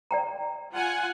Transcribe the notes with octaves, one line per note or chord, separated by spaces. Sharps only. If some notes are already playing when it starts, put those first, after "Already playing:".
D5 G5 A#5
F4 F#5 G#5